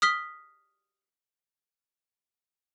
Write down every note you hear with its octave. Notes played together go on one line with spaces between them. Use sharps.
D#6 F6 B6 G7